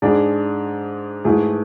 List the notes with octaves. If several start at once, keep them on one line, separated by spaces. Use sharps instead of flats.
G#2 G#3 D4 G#4 D5
G#2 E3 A3 E4 G#4